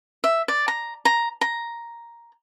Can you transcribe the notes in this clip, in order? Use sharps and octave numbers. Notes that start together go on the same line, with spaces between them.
E5
D5
A#5
A#5
A#5